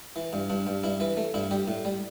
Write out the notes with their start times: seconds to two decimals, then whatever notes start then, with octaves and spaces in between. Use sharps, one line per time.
0.16 E3
0.33 G2
0.50 G2 D4
0.67 G2
0.84 G2 E4
1.00 E3 B4
1.17 A3
1.34 G2 E4
1.51 G3 G4
1.68 A2
1.85 G3